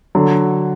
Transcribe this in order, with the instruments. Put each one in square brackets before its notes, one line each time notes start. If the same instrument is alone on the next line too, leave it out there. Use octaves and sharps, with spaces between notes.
[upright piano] D3 F#3